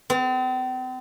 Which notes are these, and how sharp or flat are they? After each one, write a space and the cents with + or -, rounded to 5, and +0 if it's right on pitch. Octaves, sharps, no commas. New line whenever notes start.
C4 -40